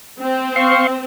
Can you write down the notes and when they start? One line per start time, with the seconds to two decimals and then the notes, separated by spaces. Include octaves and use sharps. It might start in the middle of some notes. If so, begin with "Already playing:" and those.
0.20 C4
0.56 F5 C6 C#6